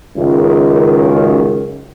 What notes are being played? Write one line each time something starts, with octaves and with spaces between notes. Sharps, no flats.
C#2 F#2 D#3